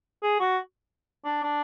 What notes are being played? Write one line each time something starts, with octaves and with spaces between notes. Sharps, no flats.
G#4
F#4
D4
D4